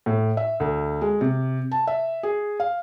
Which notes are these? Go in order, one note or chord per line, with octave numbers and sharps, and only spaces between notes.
A2
E5
D2
G#3
C3
A5
E5
G#4
F5